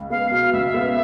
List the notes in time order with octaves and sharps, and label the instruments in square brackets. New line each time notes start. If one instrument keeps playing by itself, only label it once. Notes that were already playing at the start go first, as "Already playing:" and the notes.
Already playing: [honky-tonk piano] C#2
[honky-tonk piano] B3 [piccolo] F5
[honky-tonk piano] B2 [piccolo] F5
[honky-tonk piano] C#2 [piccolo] E5
[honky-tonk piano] B3